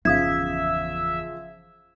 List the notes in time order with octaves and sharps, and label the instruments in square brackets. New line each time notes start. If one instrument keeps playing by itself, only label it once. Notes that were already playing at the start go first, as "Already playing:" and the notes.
[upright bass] G1 E2 [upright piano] C#3 F3 [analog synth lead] E5 [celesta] F5 D#6 G#6